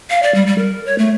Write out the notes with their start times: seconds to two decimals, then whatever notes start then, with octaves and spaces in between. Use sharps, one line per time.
0.10 F5
0.23 D5
0.35 G3
0.47 G3
0.58 A#4
0.86 C#5
0.98 A3